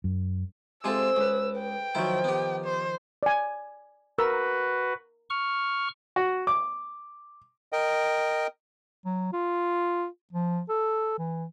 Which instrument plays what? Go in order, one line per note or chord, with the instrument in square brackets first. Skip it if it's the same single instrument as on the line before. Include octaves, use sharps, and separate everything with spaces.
[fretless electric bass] F#2
[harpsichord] C3 G#3 F4 [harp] A4 C5 G#5 [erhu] E6
[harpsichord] C#2 [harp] G#4 B4
[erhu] G5
[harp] D#3 F3 [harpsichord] F#3 E4
[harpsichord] B3 G4
[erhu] C5
[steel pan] D5 G#5
[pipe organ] F#4 B4 [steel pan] A#4 E6
[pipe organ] C#6 F6
[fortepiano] F#4
D6
[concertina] A#4 D#5 G5
[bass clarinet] F#3
F4
F3
A4
E3